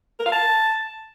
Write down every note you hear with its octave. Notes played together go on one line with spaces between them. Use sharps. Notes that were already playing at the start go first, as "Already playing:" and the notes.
A#4
F5
A5